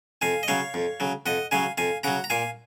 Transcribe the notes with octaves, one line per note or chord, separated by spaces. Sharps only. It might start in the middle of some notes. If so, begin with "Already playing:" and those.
F2 F5 G#5
D#5
C#3 F#3 C#5 F5
F2
C#3 F#3
F2 D#5 F#5
C#3 F#3 F5 G#5
F2 F5 G#5
C#3 F#3 F#5 A#5
A#5
A#2 F5 G#5